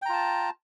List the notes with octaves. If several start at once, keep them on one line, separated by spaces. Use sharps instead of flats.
F4 G5 A5 A#5